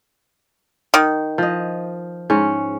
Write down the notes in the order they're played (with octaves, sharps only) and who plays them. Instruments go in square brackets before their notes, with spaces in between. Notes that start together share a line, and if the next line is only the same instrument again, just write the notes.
[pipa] D#3
[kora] F3 D#5
G#2 C#4